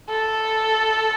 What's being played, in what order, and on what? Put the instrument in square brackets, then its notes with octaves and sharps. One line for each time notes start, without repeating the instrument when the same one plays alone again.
[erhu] A4